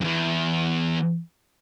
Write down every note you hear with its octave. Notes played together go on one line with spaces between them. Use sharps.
E2 G2